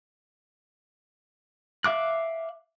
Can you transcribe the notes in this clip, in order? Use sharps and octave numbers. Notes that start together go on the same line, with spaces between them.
E5 F5 D6 F#6